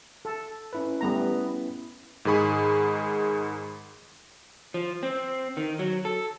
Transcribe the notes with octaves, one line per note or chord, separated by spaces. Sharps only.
A4
C#4 E4 B4
G3 A3 B3 A#5
G#2 D#3 G#4 B5 C#6
F3
C4
D#3
F#3
A4